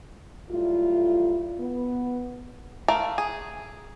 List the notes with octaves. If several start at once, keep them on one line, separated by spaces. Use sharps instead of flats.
F#3 G3 A3 E4 F4
B3
A3 A#4 F5
G#4